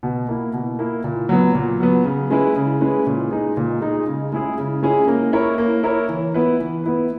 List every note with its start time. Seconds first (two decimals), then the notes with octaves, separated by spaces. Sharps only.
0.03 B2
0.29 A#3 E4
0.53 B2
0.79 A#3 E4
1.04 A#2
1.29 F#3 B3
1.55 A#2
1.80 F#3 B3
2.05 C#3
2.30 G#3 C#4 E4 B4
2.56 C#3
2.81 G#3 C#4 E4 B4
3.07 A#2
3.31 G#3 D#4 G#4
3.57 A#2
3.81 G#3 D#4 G#4
4.07 C#3
4.32 G#3 C#4 E4 G#4
4.58 C#3
4.83 G#3 C#4 E4 G#4
5.08 A#3
5.33 E4 A#4 C#5
5.58 A#3
5.83 E4 A#4 C#5
6.09 E3
6.34 B3 E4 B4
6.59 E3
6.84 B3 E4 B4